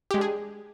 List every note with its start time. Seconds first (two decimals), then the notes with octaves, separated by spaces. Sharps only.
0.11 G4
0.14 G#3
0.18 D4
0.21 G#4